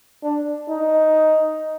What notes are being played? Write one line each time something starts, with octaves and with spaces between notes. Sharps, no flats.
D4
D#4